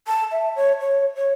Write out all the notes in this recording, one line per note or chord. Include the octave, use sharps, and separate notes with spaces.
A5
E5
C#5
C#5
C#5